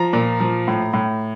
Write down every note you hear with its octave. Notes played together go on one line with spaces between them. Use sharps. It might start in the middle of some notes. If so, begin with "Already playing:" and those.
Already playing: F3 A#5
A#2
F3
A2
A2